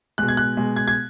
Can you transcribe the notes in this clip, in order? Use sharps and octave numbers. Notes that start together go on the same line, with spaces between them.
B2 G#3 F#6
G#6
F#6
B2 G#3
G#6
G#6